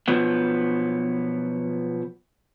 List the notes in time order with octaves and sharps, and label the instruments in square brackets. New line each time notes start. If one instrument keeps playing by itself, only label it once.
[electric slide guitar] B2 F3 F#3 B3